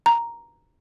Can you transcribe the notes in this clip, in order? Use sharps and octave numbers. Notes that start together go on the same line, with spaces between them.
A#5